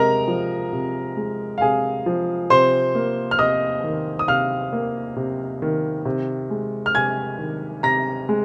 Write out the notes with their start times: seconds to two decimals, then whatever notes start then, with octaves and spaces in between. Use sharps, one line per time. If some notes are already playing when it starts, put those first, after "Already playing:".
Already playing: C3 G#3 A#4 D#5 A#5
0.28 F3
0.73 C3
1.17 G#3
1.58 F5
1.61 C3 G#4 G#5
2.06 F3
2.50 C3 C5 C6
2.95 A#3
3.31 F6
3.39 C3 D#5 D#6
3.84 D#3
4.19 D#6
4.28 C3 F5 F6
4.73 A#3
5.16 C3
5.62 D#3
6.05 C3
6.50 G#3
6.86 F6
6.95 C3 G#5 G#6
7.39 D#3
7.83 C3 A#5 A#6
8.29 G#3